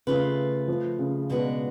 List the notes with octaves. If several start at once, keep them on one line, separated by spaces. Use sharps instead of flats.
C#3 A3 F4 B4
F3
C#3
B2 G#3 D4 F#4 B4